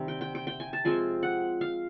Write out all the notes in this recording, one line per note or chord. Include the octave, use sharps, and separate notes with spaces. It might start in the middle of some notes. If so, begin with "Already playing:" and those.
Already playing: C3 D#3 G3
G5
G5
G5
G5
G#5
A5
F3 G#3 C4 F4 G#5
F#5
F5